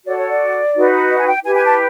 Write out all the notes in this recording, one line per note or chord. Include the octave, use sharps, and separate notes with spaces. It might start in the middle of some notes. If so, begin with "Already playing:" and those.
F#4 A4 C#5 D5
C#5
D5
D#4 F#4 B4
D#5
G#5
G5
E4 G4 B4 G#5
G#5
A5